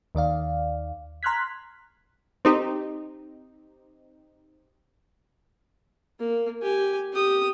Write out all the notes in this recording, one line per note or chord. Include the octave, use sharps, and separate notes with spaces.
D#2 D#3 D5 F5
A#5 C6 F6 F#6 G#6 B6
C4 D#4 G4
A#3
G4 G#5
G4 D#6